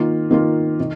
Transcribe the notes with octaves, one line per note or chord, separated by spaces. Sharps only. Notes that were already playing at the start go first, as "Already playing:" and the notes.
Already playing: D#3 A#3 F4
D#3 A#3 F4
D#3